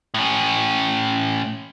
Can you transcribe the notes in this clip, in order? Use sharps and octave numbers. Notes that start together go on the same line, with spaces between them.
A2 C#4